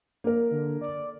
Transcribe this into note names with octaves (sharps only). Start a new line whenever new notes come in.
A#3 A#4
D3
D5